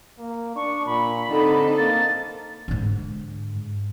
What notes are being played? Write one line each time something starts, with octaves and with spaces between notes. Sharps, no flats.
A#3
D4 C#6
A#2 B5
D3 C4 D#4 A4
A#3 A6
G#2 D3